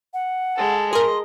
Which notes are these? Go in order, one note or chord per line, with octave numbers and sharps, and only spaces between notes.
F#5
G#3 A4
G#4 A#4 D#5 C6